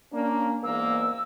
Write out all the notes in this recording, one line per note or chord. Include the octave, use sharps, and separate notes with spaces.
A#3 C#4 D4
E2 G#2 A#3 E6